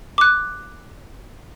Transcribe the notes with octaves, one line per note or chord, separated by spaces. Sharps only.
D6 F#6